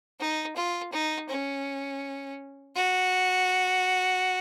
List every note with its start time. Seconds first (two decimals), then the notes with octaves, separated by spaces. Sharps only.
0.20 D#4
0.56 F4
0.92 D#4
1.29 C#4
2.76 F#4